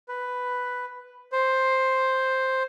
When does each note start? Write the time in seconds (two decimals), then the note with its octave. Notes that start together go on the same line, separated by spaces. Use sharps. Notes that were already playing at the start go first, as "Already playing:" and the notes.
0.08 B4
1.32 C5